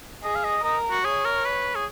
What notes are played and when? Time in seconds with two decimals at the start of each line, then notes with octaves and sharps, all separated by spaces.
0.23 G#4 D#5
0.35 F5
0.44 D#5
0.64 A#4 D#5
0.91 F#4
1.05 G#4 C#5
1.25 A#4
1.45 B4
1.75 G#4